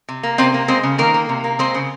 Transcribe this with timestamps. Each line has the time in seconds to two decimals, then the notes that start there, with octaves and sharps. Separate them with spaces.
0.09 C3
0.23 A#3
0.38 C3 C4 C5
0.54 A#3
0.68 G#3 C4 C5
0.83 C#3
0.98 D#3 A#3 A#4
1.14 A#3
1.29 C3
1.44 A#3
1.59 G#3 C4 C5
1.74 C#3